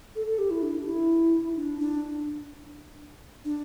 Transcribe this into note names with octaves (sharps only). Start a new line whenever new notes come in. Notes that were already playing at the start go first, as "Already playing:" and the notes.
A4
A4
G4
E4
D4
E4
D4
D4
D4